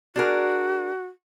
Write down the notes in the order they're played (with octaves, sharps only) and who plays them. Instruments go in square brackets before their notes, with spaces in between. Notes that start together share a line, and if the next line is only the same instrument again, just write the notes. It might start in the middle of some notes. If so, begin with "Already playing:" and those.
[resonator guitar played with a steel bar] D4 G#4 A#4 [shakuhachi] F#4